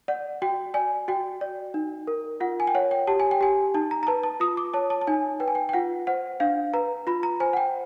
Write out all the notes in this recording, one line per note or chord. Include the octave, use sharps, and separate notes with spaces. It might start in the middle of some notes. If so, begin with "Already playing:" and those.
D5 F#5
F#4 G5
D5 G#5
F#4 G5
D5
D#4
A#4
F4 F#5
G#5
G5
C#5 F#5
G5
G4 A5
G#5
G5
G4 G#5
D#4 A5
A#5
A#5
B4 A5
A5
F4 D#6
D6
C#5 A5
A5
A5
D#4 G#5
B4 G5
G#5
G5
G5
F4 F#5
C5 F#5
D4 F5
B4 A#5
F4 B5
A#5
C5 G#5
F#5
G5